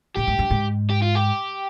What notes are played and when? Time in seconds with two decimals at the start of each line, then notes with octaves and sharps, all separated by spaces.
0.16 A#2 G4
0.27 G#2
0.39 G2
0.51 G#2
0.90 G4
1.02 F4
1.15 G4